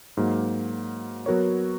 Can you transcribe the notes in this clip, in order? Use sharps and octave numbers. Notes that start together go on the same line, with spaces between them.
G#2 F#3 A#3
F#3 B3 F#4 A#4 C#5